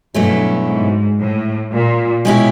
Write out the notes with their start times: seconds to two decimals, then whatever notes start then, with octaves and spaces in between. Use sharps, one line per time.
0.14 G2 B2 F#3 A3 C#4 E4
0.66 G#2
1.20 A2
1.72 A#2
2.25 B2 G#3 C#4 E4 G4